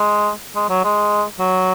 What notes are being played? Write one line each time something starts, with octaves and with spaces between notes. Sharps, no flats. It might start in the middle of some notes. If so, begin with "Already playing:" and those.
Already playing: G#3
G#3
F#3
G#3
F#3